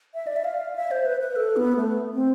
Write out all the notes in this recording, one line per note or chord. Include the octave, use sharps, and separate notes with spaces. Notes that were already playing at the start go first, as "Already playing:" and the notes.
E5
D5
E5
F5
E5
C5
B4
B4
A4
B3
A3
C4